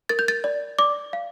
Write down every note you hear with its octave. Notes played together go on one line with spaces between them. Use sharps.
A#4 A6
G6
A6
D5
D5 D6
F5